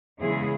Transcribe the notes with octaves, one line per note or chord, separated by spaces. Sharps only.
E2 C#3 E3 G#3 E4 G#4